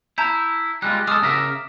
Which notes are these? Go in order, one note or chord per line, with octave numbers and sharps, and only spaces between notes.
E4 A5 A#5 G6
G3 G#3 F4 F#6
G#3 A4 D6 D#6 F6
C#3 A#4 E5